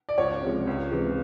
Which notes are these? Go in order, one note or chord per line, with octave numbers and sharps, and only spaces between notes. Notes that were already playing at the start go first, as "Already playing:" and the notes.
D5
C#2 C#5
C3 F3 G#3
C#2
C3 E3 G#3